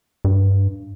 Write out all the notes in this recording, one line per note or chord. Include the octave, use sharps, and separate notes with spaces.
G2